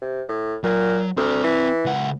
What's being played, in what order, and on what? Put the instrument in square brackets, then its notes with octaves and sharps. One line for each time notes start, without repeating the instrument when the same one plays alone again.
[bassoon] C3
A2
[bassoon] A#2 [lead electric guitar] F#3
[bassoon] D2 [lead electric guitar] C4 D5
[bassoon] E3
[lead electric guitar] C#2 F#5